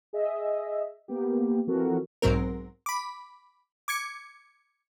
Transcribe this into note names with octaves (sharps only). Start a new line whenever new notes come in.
G#4 D#5 E5
A#3 B3 G4
E3 F3 C4 F#4 A4 A#4
B1 G#2 F#3 C4 A#4
B5 D6
D6 G#6 C#7